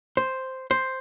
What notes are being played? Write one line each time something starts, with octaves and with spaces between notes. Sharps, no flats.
C5
C5